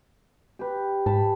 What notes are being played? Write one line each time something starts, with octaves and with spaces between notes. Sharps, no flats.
G4 B4
G#2 A5 B5